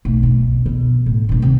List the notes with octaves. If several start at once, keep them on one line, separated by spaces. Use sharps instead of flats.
B1 A3
B2
B2
A2
G2 A#2
C3 D#3